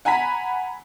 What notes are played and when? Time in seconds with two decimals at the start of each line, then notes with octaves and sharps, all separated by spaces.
0.05 F#5 G#5 A#5 B5 B6